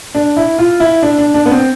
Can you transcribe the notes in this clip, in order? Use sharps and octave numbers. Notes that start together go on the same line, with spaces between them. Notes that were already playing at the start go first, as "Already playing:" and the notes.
D4
E4
F4
E4
D4
D4
D4
B3
C4